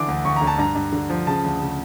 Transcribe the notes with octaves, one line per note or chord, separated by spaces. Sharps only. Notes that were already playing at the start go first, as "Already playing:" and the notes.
Already playing: D3 E3 D6
D2
D2 C#6
A#5
D2
A5
G2 A#5
G2
D3
F3
C#3 A5
D2
C#3